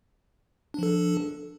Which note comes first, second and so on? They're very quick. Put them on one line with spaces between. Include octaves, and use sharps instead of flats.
D4 F3 A4